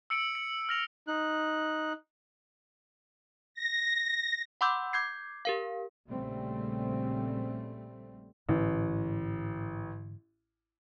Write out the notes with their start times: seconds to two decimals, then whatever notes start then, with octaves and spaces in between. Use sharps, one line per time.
0.10 E6 C#7 D7 F#7
0.35 C#7
0.69 F6 A#6 F7
1.08 D#4 F#6
3.54 A#6
4.61 F#5 B5 C6 D6 E6 G6
4.93 D6 G6 G#6 C7
5.45 G4 A#4 F5
6.09 A#1 C#3 G3 A3 C4
8.49 A1 G#2 D3 E3